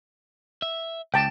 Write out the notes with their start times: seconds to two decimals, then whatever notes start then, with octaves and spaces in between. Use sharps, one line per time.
0.62 E5
1.14 C#2 G5 A5